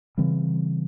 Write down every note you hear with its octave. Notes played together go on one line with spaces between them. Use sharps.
C#3 E3 G3 C4